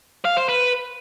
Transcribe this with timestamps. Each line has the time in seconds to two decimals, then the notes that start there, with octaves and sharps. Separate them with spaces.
0.25 F5
0.37 C5
0.49 B4